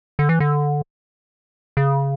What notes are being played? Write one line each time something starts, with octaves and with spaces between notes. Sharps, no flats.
D3
E3
D3
C#3